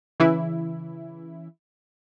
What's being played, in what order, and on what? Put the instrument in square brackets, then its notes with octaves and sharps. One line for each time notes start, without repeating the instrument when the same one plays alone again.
[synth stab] C#3 E3 E4